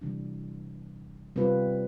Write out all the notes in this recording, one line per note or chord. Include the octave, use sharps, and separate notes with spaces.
C3 E3 G3 D4
C3 G3 C4 F4 B4